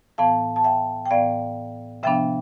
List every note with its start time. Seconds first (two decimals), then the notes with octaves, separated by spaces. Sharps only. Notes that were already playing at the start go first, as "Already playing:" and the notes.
0.18 A2 E3 B3 F5 A5
0.56 A5
0.64 E5 G5
1.06 G5
1.11 A2 E3 B3 D5 F5
2.03 C3 F3 B3 D4 E5 G5